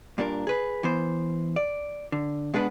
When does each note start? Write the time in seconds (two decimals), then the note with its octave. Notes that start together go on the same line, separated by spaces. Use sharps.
0.18 G2 A#2 D4 A#4
0.47 G#4 B4
0.83 E3 B3 C5
1.56 D5
2.12 D3
2.54 B2 G#3 B3 D4 B4